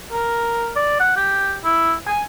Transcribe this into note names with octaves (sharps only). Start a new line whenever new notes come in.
A#4
D5
F#5
G4
E4
G#5